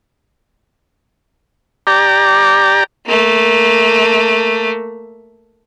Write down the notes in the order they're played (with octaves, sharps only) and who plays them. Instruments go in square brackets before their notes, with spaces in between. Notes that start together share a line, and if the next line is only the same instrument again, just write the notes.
[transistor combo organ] G4 D5 A#5
[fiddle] A3 A#3